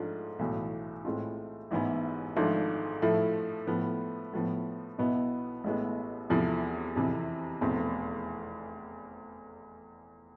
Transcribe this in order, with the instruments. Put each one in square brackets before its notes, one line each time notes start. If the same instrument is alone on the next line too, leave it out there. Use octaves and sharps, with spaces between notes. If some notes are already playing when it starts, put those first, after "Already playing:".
Already playing: [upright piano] G#2 F3 A3 D4 F4
B1 A2 E3
A2 G#3 C4 F4
A1 G#2 E3 B3 E4
G#1 G#2 F3 A3 D4
A2 F3 A3 E4
A2 F3 B3
A2 F3 B3
B1 B2 B3 E4
A1 A2 G#3 B3
E2 C3 F3 A3 E4
F2 C3 E3
F1 E2 B2 A3 C4